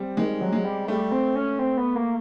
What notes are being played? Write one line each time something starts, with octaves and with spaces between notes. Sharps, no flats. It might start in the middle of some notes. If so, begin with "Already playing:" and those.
Already playing: G3 C4
D#3 G#3
F#3
G#3
G3
G3 A3
C4
C#4
C4
B3
A#3